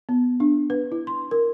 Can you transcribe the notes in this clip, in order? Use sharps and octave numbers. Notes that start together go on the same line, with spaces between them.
B3
D4
B4
E4
C6
A#4